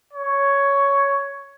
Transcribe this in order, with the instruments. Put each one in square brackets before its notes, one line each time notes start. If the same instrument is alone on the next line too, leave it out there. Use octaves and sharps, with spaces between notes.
[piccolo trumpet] C#5